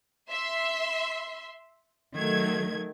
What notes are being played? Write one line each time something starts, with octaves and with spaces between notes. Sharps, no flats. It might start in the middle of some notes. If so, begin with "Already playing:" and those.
E5 C6
D#3 F#3 A3 G#6